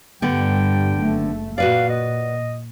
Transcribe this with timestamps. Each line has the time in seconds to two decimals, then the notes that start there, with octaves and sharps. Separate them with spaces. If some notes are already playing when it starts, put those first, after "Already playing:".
0.22 G2 D3 G3 B3 G5
0.98 F#1 A3
1.58 A#2 F#4 B4 D5 F5
1.89 D#5